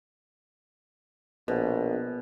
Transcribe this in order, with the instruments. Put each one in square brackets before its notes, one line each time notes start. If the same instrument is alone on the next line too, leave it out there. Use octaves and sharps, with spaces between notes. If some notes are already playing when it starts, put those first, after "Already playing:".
[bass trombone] A#1 [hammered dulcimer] B2